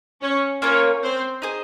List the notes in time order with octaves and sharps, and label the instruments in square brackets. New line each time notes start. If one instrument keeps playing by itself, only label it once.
[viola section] C#4 C#5
[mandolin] A#3 F4 A#4 [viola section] C#4 C#5
[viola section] C4 C5
[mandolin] D#4 G#4 C5